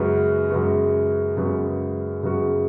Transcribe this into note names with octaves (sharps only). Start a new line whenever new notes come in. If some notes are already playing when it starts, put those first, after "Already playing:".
Already playing: F#2 C#3 G#3 B3 F#4
F#2 C#3 G#3 B3 F#4
F#2 C#3 G#3 B3 F#4
F#2 C#3 G#3 B3 F#4